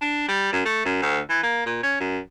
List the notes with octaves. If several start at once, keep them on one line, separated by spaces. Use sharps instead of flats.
D4
G3
F#2
A3
F#2
D2
E3
A#3
A#2
C#4
F#2